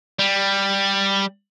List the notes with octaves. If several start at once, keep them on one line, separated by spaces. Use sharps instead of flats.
G3